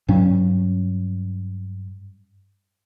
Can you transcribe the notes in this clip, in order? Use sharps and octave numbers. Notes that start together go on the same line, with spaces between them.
G2 F#3 C#4